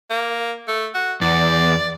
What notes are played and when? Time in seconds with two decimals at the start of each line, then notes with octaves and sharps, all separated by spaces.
0.10 A#3
0.68 A3
0.94 F#4
1.22 E2 D5